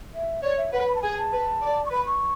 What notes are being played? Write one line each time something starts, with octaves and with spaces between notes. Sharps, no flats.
E5
C#5 D5
E5
B4 F#5
B5
A5
G#4 G#5
A5
B4
D5
C#6
B4 B5
C#6